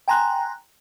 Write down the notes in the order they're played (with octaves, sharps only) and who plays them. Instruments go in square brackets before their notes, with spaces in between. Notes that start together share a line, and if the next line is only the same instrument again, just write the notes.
[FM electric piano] G5 G#5 A#5 C6 F#6